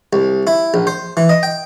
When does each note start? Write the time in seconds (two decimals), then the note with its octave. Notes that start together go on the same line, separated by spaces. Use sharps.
0.13 C2
0.47 E4
0.74 A#1
0.87 C5
1.17 E3
1.29 D#5
1.43 G5